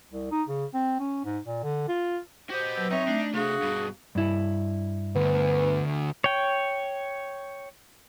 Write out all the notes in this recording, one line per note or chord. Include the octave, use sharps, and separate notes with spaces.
C2
D#4
C#3
C4
C#4
G#2
A#2
D3
F4
F#4 G4 C5 D#5
F#3 B4 E6
B1 C4 D#4 C#5 E5 G5
A3 D4
C3 A3 D4 F#4 G#4 F5
G2 B2
G2 E4
D2 B3
C#5 G5